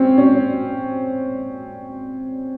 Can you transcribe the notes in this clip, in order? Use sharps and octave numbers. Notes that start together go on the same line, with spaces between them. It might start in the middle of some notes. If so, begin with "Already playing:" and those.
Already playing: C4 C#4
C#4